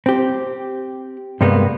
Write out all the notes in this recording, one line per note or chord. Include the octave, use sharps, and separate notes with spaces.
C4 G4
G2 C3 G3 G#3 A#3 B3